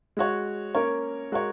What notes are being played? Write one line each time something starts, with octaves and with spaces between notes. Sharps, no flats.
G#3 F#4 C#5
A#3 C#4 A#4 C#5
G#3 F#4 A#4 C#5